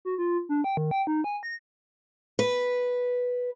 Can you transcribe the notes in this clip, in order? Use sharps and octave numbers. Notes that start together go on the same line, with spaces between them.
F#4
F4
D4
G5
D#3
G5
D#4
G#5
A#6
B4